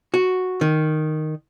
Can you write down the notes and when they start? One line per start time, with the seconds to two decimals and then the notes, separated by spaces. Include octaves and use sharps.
0.14 F#4
0.61 D#3